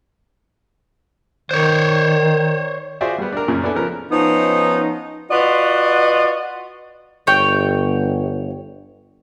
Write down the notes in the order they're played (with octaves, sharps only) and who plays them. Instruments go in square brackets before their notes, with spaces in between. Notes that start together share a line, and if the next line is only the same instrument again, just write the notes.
[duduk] D#3 [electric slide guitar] C5 C#5
[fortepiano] F4 F#4 G#4 C5 D5 E5
G3 B3
D4 A#4
F#2 A#2 C#3
B3 D4 E4 A4 G#5
C#3 F3 B3 A#4
[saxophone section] F3 B3 C#4 D#4
F4 F#4 B4 D5 D#5
[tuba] G1 [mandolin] C#5 G5